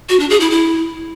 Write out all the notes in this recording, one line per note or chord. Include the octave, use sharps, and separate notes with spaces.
F#4
D4
G#4
E4
E4